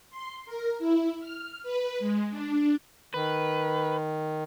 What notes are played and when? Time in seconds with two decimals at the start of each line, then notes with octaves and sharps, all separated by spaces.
0.10 C6
0.46 A#4
0.79 E4
1.21 F6
1.63 B4
1.99 G#3
2.31 D4
3.14 D#3 B4